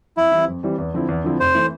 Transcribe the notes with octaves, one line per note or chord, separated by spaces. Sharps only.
F2 E4
E3 G3 C4
F2
E3 G3 C4
E2
D3 F3 C4 E4
E2
D3 F3 C4 E4
F1 C5
E3 A3